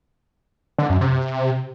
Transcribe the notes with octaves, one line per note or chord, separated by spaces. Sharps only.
D3
F#2
C3